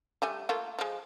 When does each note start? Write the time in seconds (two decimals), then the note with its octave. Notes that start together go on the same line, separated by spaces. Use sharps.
0.22 G3 A3 G#5
0.49 A3 A#3 F4
0.79 F3 G#3